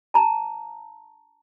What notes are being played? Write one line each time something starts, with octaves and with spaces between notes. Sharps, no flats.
A5 A#5